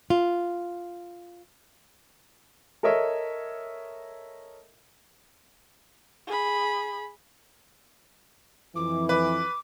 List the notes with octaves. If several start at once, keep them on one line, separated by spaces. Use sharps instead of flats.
F4
A4 A#4 C#5 D#5 E5
G#4 B5
F2 E3 D6
B4 D6